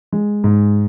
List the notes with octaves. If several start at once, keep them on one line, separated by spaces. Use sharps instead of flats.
G#3
G#2